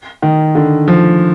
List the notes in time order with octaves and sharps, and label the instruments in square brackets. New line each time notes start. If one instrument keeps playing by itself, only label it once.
[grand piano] D#3
D3
F3